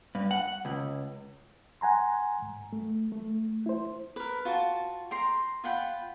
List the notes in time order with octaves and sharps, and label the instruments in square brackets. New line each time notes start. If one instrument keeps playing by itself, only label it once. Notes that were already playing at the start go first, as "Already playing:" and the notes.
[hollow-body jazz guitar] G2
F#5
C#2
[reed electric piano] F#5 G#5 A#5 C6
G#2
A3
A3
E4 C5
[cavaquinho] A#4 B4
F4 F#4 A5
G5 A#5 C6
F4 F#5 G5 B5